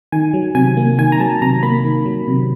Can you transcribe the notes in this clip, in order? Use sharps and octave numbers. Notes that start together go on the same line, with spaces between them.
D#3 G#5
F#3
C3 G#5
A#3
D#3 G#5
A#5
F#3 A5
C3 A#5
A#3 B5
D#3
F#3
C3